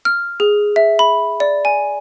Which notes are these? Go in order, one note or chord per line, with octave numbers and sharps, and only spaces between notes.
F6
G#4
E5
B5
D5
G#5